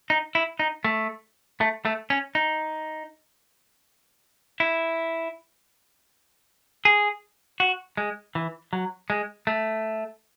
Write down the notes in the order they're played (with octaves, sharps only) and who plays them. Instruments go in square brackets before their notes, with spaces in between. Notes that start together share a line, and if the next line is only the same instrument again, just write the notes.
[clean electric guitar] D#4
E4
D#4
A3
A3
A3
C#4
D#4
E4
G#4
F#4
G#3
E3
F#3
G#3
A3